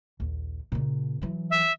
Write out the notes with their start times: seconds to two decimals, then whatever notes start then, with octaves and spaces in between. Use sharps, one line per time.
0.20 A#1 D#2
0.72 A#2 C#3
1.22 E3 F#3
1.50 E5